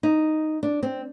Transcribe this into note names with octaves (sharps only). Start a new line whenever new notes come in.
D#4
D4
C4